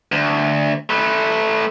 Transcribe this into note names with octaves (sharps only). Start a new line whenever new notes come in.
D2
A3 B4